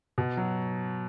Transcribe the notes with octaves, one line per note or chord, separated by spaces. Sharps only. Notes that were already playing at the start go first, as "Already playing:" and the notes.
B2
F#3